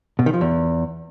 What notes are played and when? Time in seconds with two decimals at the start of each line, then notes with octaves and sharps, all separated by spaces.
0.19 B2
0.26 D#3
0.34 F3
0.41 E2